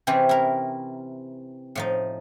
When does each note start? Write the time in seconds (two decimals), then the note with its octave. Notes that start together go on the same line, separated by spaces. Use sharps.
0.07 C3 E3 C4 C#4 G4 G#4
0.29 E4 A#4
1.75 A2 F3 D#4